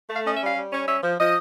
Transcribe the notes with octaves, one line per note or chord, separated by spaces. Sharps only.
A3
F5
C#4 D#5
E5
G3 F5
G3
C#4
C#4 E5
F3
F3 D#5